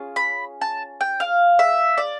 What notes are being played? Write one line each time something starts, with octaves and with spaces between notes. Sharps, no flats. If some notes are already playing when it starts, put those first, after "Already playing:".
Already playing: C#4 F4 G#4
B5
A5
G5
F5
E5
D5